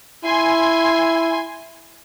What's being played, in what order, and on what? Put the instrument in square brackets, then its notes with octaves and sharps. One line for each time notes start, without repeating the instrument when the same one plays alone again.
[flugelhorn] E4 [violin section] G#5 C6